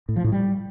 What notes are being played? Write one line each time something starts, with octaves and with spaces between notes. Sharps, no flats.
A2
F3
A2
G3